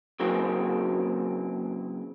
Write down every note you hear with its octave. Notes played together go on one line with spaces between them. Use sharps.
C#3 E3 F#3 A#3 C4